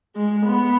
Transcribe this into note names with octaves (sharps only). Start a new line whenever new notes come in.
G#3
B3